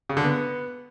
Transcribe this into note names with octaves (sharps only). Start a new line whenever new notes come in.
C#3
D3
B3